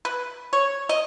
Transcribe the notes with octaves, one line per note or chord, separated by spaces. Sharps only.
B4
C#5
D#5